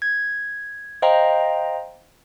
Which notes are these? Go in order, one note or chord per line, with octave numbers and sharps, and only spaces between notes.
G#6
C5 D#5 F5 G5 A#5